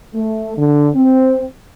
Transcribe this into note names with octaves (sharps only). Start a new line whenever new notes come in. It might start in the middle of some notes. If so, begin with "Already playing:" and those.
A3
D3
C4